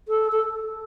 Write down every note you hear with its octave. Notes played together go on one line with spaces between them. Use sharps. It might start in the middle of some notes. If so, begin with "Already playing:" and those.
A4
A4